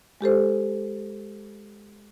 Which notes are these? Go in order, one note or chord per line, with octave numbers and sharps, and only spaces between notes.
G#3 G4 A4 C5